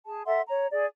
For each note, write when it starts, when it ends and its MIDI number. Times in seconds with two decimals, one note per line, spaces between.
0.06 0.22 68
0.06 0.22 81
0.25 0.40 69
0.25 0.40 76
0.25 0.40 78
0.25 0.40 84
0.49 0.67 73
0.49 0.67 82
0.71 0.85 68
0.71 0.85 74